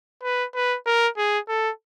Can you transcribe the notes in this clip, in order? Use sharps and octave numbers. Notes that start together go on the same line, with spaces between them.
B4
B4
A#4
G#4
A4